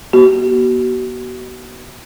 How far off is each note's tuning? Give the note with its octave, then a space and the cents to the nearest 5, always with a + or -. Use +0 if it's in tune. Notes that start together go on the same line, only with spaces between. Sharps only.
B3 -40 F#4 +35